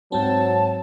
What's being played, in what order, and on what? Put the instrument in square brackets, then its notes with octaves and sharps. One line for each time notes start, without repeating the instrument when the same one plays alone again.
[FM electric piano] G#2 C4 [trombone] F#3 [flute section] A5